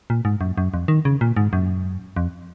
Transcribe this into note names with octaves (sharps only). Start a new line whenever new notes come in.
A#2
G#2
F#2
F#2
F2
D#3
C#3
A#2
G#2
F#2
F2